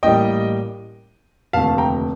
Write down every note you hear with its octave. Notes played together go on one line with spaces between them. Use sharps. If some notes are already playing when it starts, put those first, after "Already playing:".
A1 A2 G3 A#3 D#5 G5
F1 D#2 D3 A3 F5 A5
G5 A#5